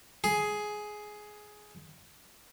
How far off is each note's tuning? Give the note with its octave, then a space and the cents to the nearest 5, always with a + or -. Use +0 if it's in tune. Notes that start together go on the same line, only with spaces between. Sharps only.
G#4 +10